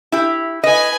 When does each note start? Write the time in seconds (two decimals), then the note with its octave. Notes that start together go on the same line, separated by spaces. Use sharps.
0.12 E4 G4
0.64 B4 D#5 G#5